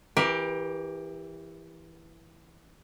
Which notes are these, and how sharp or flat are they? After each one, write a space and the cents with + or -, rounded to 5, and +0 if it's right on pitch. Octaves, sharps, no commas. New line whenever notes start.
E3 +0 G4 +20 A#4 +25